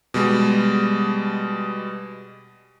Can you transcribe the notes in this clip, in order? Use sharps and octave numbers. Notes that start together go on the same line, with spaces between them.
B2 G3 G#3